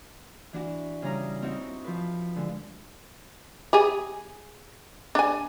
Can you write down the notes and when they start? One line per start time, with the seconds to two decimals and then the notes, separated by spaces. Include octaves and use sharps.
0.53 E3 D4 F#4
1.02 C#3 G3 A#5
1.42 C4 D#4 E4 F#4
1.84 F3 B4
2.36 D3 G#3
3.73 G4 G#4 G#5
5.15 D4 G#5